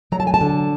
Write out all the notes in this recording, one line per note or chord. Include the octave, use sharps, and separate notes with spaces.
F#3 A#5
A5
G#5
A5
D3